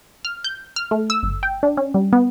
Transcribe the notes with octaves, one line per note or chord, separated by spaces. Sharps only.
F6
G6
F6
A3
E6
G1
G5
D4
C#4
G3
B3